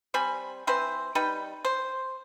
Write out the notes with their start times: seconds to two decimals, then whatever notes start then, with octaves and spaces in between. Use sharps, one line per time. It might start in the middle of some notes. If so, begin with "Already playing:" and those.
0.14 G3 C4 G#5 B5
0.67 E3 C4 B4 C5
1.15 G3 D#4 B4 G5
1.65 C5